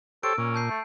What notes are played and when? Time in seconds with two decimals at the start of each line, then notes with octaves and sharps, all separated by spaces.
0.23 G4 A4 C5 C#5 E6 D7
0.38 A#2 C#4
0.54 A5 G6 C7
0.69 A3